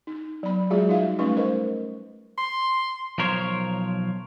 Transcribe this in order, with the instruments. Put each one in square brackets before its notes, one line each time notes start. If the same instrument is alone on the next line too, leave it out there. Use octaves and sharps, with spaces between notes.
[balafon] D#4
F#3 B3 B5
F#3 G#3 F4 F#4 G#4 E5
G3 D#4 F4 F#4 E5 F5
G3 A3 C#4 D#4 B4 C#6
A#4 C5 D#5
[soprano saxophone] C6
[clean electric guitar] B1 F3 A#4 C5 C#5